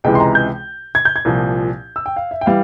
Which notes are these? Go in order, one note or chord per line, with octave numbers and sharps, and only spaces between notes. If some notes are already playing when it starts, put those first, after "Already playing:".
C#2 C3 E3 G#3 G5
C6
A#5
G6
G#6
G6
G#6
C2 A#2 F3
E6
G5
F5
E5
G5
E3 G3 F5